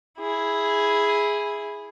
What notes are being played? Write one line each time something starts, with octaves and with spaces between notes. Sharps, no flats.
E4 G#4